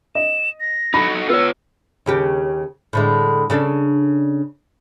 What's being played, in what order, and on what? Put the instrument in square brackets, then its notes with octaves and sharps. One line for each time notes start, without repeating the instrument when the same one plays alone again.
[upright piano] D#5 [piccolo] E7
[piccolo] A#6
[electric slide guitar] D#4 F#4 A4 [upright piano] B5
[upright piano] B3 [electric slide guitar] F4 C#5 [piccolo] E6
[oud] D#2 C#3 G4
A2 D3 G#3
C#3 D4 A4